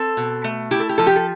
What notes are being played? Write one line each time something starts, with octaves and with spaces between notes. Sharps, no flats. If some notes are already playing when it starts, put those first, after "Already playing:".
Already playing: C4 A4
B2
A3
E4 G4
A4
G4
F3 A4
G4
A4